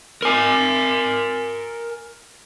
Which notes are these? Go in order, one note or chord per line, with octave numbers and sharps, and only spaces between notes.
A#4 G#5